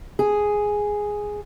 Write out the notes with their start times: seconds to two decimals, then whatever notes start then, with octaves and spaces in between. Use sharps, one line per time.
0.19 G#4